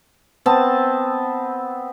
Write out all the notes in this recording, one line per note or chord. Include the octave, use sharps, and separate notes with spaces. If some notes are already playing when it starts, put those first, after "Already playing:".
B3 C4 A5